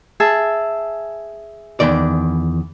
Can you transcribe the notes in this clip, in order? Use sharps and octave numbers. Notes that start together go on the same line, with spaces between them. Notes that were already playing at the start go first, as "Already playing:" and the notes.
G#4 E5 A5
E2 D#3 D5